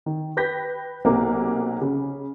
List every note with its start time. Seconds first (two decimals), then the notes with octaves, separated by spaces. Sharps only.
0.06 D#3
0.37 B4 G5 G6 A#6 B6
1.05 B1 C3 A#3 A#4
1.81 C#3